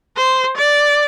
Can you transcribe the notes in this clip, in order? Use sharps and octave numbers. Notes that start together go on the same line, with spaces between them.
C5
D5